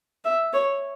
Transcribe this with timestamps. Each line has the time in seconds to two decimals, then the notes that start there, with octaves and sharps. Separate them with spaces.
0.25 E5
0.54 C#5